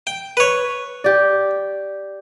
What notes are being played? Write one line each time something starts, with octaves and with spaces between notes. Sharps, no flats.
G5
B4 C#5
G4 D5